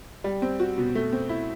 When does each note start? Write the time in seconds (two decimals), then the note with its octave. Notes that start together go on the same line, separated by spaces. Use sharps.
0.24 G3
0.42 C4
0.60 F#4
0.78 B2
0.95 A3
1.12 C4
1.29 E4